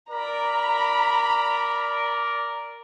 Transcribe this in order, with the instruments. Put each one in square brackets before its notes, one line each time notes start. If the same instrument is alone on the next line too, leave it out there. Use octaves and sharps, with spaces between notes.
[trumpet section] A#4 D5 [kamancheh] A#5 B5